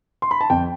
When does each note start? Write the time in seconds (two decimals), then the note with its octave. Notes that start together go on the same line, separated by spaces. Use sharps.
0.22 C6
0.31 B5
0.41 A5
0.50 F2 G5